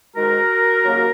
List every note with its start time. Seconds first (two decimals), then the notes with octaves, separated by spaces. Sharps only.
0.14 G#2 D#3 G#3 F#4 A#4
0.84 D#2 C#3 F#3 A#3